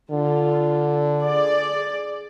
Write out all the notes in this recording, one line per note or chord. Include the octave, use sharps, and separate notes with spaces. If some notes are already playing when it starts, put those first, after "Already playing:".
D3 F4
G#4 D5